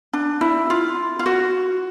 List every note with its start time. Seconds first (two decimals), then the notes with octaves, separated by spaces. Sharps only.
0.13 D4
0.41 E4
0.70 F4
1.19 F4
1.26 F#4